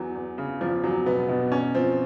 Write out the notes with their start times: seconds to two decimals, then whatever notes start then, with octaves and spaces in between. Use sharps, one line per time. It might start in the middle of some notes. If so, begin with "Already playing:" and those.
Already playing: E2 E3 F#3
0.15 E2
0.38 C#3
0.61 E2 F3
0.83 E2 F#3
1.06 B2 B3
1.29 B2
1.52 E2 C#4
1.75 F3 C4